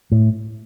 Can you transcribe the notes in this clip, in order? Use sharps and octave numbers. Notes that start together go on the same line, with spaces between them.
A2